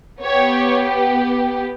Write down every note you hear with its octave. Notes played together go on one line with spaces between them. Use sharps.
B3 G4 C#5